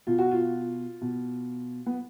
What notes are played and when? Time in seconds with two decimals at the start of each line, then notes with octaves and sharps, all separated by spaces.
0.07 B2 F4
0.18 F#4
0.31 F4
1.01 B2
1.86 B3